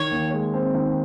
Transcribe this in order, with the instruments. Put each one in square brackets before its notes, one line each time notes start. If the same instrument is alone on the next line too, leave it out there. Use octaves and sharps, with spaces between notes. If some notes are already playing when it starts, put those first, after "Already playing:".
Already playing: [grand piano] D#3 [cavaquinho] C#5
[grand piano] D#2
G#3
C4
D#3